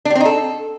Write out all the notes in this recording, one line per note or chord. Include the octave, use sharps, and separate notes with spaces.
D4
G3
C4
D#4
A4